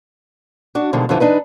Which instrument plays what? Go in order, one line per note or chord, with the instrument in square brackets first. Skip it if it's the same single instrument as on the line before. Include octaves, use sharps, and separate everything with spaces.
[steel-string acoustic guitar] D4 F#4
B2 D3 D#3 F3 G3 G#3
F2 D3 E3 F3
E3 D4 D#4 B4